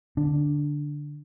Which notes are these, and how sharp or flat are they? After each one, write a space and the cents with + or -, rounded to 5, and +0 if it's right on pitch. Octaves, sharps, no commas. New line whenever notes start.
D3 +0 D4 +0